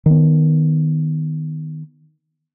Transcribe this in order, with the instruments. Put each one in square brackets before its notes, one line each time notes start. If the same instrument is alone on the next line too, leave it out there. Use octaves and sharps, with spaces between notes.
[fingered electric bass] D#3 B3